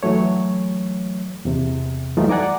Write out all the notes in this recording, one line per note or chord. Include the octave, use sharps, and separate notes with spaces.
E3 F#3 A3 C#5
E2 C3
E3 F#3 G3 A3 D#4 F4
D5 F#5 G#5 A#5 D6